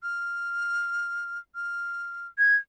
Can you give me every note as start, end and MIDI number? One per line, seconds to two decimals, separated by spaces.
0.03 1.39 89
1.55 2.27 89
2.38 2.56 92